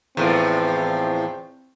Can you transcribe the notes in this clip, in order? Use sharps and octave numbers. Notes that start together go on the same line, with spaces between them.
E2 A2 F3 C4